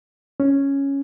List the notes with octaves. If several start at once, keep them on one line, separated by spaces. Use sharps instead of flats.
C#4